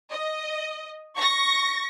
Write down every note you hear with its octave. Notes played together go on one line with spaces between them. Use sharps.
D#5
C#6 A#6